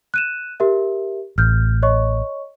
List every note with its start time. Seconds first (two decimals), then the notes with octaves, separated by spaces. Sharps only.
0.14 F#6 D#7 E7
0.60 G4 A#4 E5
1.38 A1 F6 G6
1.83 C#5 D#5 C#6